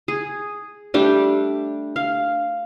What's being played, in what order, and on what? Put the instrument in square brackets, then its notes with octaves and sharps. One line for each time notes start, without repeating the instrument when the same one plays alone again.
[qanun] G#4
G3 A3 D4 G4
F5